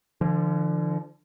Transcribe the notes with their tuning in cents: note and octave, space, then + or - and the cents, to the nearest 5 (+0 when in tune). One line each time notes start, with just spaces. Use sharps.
D3 +20 F3 -35